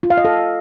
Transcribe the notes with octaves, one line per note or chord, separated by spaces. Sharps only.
F4
F5
D#5
A4